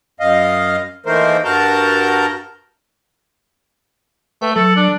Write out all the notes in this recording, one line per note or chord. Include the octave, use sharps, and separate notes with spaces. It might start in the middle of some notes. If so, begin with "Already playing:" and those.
F#2 D#5 F5
D#3 E3 A3 A#3 A#4 C5
G2 F#4 A#4 A5 A#5 G6
A3 B4 G5
F#3 A4
D4